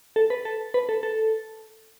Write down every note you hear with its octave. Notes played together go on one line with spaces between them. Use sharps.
A4
B4
A4
B4
A4
A4